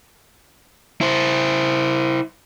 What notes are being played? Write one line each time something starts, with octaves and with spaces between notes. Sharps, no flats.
E4 C5